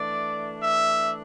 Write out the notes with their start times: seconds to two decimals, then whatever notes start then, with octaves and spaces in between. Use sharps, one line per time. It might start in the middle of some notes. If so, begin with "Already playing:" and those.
Already playing: E3 A3 D4 D5
0.62 E5